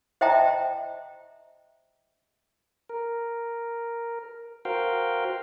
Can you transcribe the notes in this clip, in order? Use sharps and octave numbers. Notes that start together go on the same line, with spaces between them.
C5 D#5 E5 G5 A5 A#5
A#4
F#4 A#4 C5 F5 G5